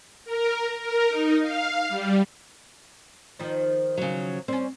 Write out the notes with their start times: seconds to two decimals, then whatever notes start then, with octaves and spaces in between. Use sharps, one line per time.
0.25 A#4
0.80 A#4
1.10 D#4
1.42 F5
1.89 G3
3.39 D#3 F3 D#4
3.97 C#3 F#3
4.48 G3 C4 C#4